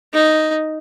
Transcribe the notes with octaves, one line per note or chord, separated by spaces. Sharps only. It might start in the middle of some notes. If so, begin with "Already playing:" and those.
D#4